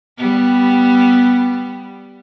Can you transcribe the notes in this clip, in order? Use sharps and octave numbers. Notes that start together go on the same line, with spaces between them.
G3 B3